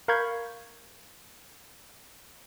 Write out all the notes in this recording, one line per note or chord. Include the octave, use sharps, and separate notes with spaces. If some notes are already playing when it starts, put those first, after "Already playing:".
A#4 F5 B5 C#6 G6 G#6